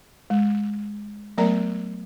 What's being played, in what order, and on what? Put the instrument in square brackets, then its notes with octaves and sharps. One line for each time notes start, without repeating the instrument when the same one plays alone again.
[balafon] G#3
F#3 A3 B3 A#4 D5 A#5